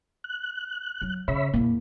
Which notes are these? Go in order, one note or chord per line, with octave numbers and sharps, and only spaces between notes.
F#6
F#3
C#3 C#5 E5 B5
E2 A#2 A#3